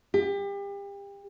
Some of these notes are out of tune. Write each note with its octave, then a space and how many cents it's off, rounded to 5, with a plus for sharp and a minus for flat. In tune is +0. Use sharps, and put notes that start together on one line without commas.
G4 +30